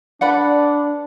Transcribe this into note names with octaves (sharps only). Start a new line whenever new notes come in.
D4 B4 D5 F#5 B5